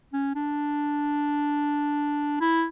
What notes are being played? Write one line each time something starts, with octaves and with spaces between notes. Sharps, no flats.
C#4
D4
E4